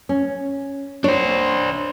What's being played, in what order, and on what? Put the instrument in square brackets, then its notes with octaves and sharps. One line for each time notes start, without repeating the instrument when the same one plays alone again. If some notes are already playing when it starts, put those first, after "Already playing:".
[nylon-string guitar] C#4
[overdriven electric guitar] D4 C5 [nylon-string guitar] C#5